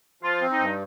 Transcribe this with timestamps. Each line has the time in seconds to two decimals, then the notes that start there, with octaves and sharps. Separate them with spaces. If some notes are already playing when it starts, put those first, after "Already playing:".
0.23 F3 F4
0.41 C4
0.50 D#4
0.59 G2